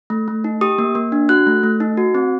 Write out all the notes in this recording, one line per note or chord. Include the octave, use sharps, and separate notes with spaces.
A3
A3
D#4
G4 D#6
A#3
A#3
D4
F#4 F#6
A3
A3
D#4
F#4
C4